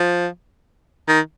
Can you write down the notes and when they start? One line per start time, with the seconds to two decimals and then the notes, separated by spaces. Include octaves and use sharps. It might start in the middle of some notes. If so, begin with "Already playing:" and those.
Already playing: F3
1.08 D#3